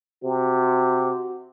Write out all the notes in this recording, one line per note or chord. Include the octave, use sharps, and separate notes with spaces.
C3 F#4